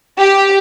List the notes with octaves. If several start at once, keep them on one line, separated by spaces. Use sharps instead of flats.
G4